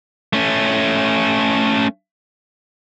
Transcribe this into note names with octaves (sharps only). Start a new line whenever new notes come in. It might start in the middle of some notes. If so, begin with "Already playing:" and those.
A3 C#4